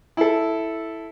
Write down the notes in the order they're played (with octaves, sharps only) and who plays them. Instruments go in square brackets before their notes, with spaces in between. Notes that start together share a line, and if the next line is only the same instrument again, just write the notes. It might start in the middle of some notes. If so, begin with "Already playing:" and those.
[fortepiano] E4 A4